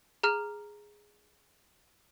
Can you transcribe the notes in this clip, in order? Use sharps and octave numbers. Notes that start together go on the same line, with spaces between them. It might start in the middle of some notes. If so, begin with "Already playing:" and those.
G#4 A#5 F6